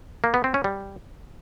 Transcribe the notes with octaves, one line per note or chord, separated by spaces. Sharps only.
A#3
B3
C4
C#4
G3